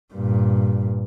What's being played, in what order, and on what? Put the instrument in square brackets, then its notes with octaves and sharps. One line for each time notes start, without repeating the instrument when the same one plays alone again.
[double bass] G2 A#2